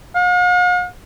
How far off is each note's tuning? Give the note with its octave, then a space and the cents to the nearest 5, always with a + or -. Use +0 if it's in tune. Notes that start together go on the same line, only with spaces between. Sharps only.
F5 +45